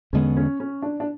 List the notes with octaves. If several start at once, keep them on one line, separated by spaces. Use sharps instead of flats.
E2 D3 G#3 B3 C#4
C#4
C#4
D4
D4